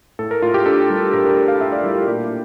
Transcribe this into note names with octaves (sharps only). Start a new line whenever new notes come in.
A2 A4
A#4
A2 F4
G4
D4 A4
G3
A2 A#4
A#4
A2 A4
F5
D4 E5
D5
G3 E4
F4
A#2 G4